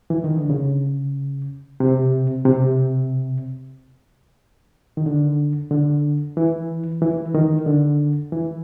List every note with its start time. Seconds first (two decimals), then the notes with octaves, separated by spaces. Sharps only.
0.10 E3
0.24 D#3
0.37 D3
0.50 C#3
1.80 C3
2.46 C3
4.97 D#3
5.06 D3
5.71 D3
6.37 E3
7.02 E3
7.34 D#3
7.66 D3
8.32 E3